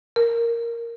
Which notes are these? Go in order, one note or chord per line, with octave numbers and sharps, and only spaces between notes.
A#4